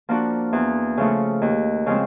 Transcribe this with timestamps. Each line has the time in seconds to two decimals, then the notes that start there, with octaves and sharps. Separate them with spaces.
0.09 F3 A#3 D4 F#4
0.53 E2
0.97 C#3 F3 A3
1.42 D#2
1.86 C#3 F3 G#3 C4